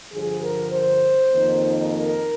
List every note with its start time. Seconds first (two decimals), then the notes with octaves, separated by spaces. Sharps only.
0.13 G2 D3 F3 G#4
0.43 A#4
0.73 C5
1.31 F2 D#3 A#3 D#4
1.90 A#4